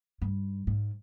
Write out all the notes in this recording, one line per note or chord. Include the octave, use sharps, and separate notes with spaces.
G2
G#2